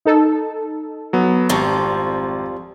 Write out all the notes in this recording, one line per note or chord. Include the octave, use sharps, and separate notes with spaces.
D#4 A4
F#3 B3
G#1 F2 F3 G3 A#5 C#6